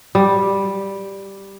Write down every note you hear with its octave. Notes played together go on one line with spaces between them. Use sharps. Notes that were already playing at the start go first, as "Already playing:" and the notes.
G3